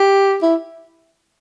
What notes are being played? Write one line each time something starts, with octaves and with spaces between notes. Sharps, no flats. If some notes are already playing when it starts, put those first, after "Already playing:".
Already playing: G4
E4